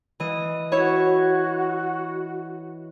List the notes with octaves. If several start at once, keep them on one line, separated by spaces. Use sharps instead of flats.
E3 D#5
E4 F#4 C#5